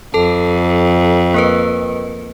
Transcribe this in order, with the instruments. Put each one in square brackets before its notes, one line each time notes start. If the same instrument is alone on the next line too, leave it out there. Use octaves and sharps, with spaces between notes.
[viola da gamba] F2 [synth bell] A4 A5
[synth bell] A#3 A#4 B4